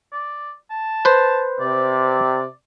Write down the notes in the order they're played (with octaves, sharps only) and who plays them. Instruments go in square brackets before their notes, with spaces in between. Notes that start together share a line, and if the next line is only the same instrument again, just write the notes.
[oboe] D5
A5
[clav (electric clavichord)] B4 C5
[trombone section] C3 [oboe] D5